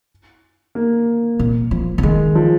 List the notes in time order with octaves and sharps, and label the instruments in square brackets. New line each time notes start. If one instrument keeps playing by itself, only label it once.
[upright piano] A#3
[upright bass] A#2
F3
C#3
[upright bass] D#3 [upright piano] G#3
[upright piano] F3